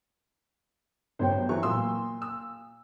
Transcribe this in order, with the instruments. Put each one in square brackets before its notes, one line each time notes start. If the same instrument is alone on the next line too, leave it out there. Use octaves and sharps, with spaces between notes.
[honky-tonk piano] G1 F#3 [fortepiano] C5 C#5 G5
[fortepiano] E3 F#3 [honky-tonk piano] C#6
[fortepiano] A#2 [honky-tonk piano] C6 E6
[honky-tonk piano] E6